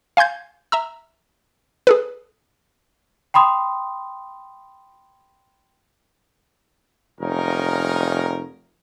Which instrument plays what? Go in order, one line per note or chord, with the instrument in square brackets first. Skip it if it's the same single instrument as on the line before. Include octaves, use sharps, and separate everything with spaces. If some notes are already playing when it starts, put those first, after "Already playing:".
[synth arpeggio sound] F5 G#5 C6 G6 G#6
E5 A#5 E6
G#4 A4 B4
[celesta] G5 B5 C6 D#6
[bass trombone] F1 [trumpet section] C#4 D#4 A#4